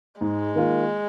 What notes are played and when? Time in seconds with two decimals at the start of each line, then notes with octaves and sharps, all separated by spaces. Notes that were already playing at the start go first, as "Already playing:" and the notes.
0.20 G#2 G#3
0.55 D#3 A#3 F4